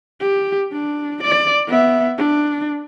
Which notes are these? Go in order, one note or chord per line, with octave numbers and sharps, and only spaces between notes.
G4
D4
D5
B3 E5
D4